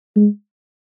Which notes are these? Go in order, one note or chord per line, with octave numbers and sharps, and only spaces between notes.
G#3